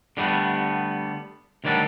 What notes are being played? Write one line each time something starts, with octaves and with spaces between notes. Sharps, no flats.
D3 G3 A3 B3
D2 D#3 F#3 G3 D4 A4